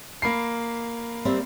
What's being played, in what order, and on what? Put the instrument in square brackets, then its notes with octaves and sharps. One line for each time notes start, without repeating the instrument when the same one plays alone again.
[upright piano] A#3 B5 C7
[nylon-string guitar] G3 C4 E5